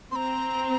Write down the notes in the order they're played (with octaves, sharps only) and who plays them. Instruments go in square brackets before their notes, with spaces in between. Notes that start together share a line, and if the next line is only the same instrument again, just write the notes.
[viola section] C4 [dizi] A#5 C6